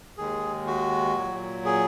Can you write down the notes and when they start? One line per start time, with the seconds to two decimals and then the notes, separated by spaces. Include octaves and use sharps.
0.18 D#2 D#3 G#3 G#4
0.67 F#4
1.16 A#2 F#3
1.65 G#4